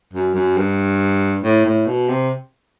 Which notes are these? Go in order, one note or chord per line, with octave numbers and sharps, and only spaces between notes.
F#2
F#2
G2
A2
A2
B2
C3